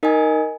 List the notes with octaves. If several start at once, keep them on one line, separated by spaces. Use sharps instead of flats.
D#4 A#4 D#5 G#5